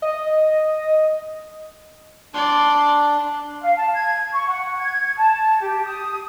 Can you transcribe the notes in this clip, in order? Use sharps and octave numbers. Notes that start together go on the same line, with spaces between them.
D#5
D4 D5 C6
F5
A5
G#6
C#6
F#5
G#6
A5
G4
D#6